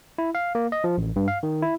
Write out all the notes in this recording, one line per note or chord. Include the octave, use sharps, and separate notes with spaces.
E4
F5
A#3
D#5
F3
A1
G2
F5
D#3
E4